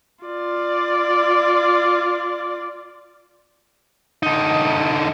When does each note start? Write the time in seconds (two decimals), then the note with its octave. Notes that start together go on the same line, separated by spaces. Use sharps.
0.24 F4 D5
4.23 D3 D#4